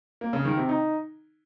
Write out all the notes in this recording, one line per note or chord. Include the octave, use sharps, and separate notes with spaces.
A#3
C#3
D#3
C3
D#4